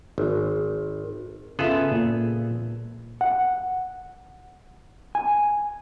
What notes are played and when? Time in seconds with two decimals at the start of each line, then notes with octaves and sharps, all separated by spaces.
0.18 G#1
1.59 C#3 B3 F4 G#4 A4 E5
1.91 A#2
3.21 F#5
5.15 G#5